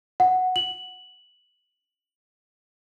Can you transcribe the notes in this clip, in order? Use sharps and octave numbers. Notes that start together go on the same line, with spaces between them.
F#5
F#7